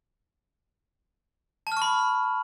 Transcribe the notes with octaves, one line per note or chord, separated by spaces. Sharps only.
A5
F6
C#6
B5